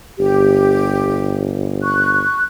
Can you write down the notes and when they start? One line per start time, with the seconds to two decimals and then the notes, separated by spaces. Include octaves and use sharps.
0.19 G1 G4
1.83 C#6 F#6